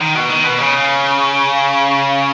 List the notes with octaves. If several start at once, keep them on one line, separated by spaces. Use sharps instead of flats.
D#3
B2
D#3
B2
C#3